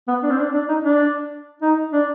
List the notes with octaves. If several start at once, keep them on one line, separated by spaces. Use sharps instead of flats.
B3
D4
C4
D4
D4
D#4
D4
D#4
D4